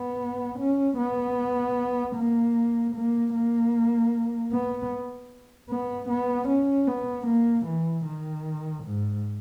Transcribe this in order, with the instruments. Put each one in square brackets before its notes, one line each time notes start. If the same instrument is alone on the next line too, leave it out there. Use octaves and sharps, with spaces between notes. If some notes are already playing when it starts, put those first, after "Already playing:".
Already playing: [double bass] B3
C#4
B3
A#3
A#3
A#3
B3
B3
B3
C#4
B3
A#3
E3
D#3
G#2